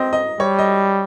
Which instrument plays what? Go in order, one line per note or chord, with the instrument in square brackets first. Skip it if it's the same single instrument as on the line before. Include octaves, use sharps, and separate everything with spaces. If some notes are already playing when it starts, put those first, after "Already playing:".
Already playing: [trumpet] C4 [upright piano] D#5
[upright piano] D#5
[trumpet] G3 [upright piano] C#5
[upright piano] D#5